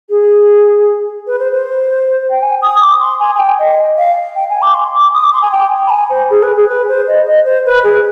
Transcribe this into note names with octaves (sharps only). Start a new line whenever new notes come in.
G#4
B4
C5
C5
G5
G#5
D#6
D6
C6
G#5
G#5
G5
D#5
F5
G5
G#5
D6
C6
D6
D#6
D6
C6
G#5
G5
B5
G#5
C5
G#4
B4
G#4
B4
C5
D#5
D#5
C5
B4
G#4